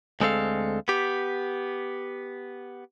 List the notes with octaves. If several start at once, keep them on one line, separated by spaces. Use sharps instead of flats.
D2 G#3 C4 A4 F5
B3 G4